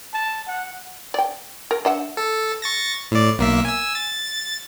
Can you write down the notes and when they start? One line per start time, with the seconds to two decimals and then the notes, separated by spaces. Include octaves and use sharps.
0.13 A5
0.48 F#5
1.14 D5 G5
1.71 A#4
1.85 D4 E5 F#5
2.17 A4
2.62 C#6 A6 A#6
3.11 A2 D5
3.38 B1 A#3 E5
3.65 G#5 E6
3.95 A6